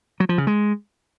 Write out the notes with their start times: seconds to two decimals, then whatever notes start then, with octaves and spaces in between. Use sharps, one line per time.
0.20 F#3
0.29 F3
0.38 C#3
0.47 G#3